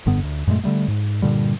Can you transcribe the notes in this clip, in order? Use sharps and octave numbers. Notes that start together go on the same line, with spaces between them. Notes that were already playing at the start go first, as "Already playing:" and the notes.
F1 G2 D3 B3
D2
F#2 A#2 G#3 A3
D3 G3 A3
G#2
G2 A#2 D3 G3